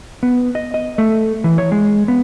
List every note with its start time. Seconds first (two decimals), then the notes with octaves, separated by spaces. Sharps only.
0.23 B3
0.55 D#5
0.74 D#5
0.98 A3
1.44 E3
1.58 C#5
1.72 G#3
2.08 B3